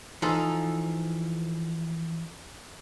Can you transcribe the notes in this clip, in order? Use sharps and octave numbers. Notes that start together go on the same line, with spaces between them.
E3 F3 D#4 A4